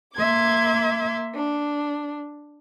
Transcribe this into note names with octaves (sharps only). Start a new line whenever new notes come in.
A#3 E5 C6 D6 G#6
D4